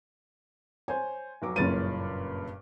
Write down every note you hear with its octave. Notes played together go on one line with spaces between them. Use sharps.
C5 C#5 G#5
F1 F#3 D6
F#1 G2 A#2 C#4 A6 D#7